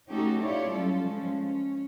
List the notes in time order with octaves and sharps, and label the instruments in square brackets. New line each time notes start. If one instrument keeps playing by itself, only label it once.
[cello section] A3 C#4 D#4 F#4 G4 A4
E4 F4 G4 C#5 D5
F#3 G3 C#4 F4 A4
F3 G#3 C#4
C#4